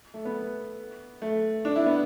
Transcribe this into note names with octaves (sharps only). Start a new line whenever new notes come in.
A3
B3
A3
D4
E4
B3